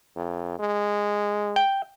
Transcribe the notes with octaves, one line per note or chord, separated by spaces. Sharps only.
F2
G#3
G5